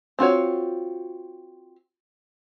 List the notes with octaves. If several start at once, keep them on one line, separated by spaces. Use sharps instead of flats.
C4 F4 F#4 C#5